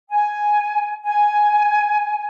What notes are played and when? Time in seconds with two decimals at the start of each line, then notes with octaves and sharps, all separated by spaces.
0.07 G#5
1.03 G#5